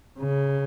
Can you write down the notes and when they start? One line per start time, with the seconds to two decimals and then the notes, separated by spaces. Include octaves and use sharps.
0.19 C#3